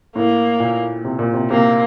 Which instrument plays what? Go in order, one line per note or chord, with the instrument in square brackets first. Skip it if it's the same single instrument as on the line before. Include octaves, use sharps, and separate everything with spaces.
[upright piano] A2 [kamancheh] A#3
[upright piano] A#2
C3
A#2
C3
[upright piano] C3 [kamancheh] A#3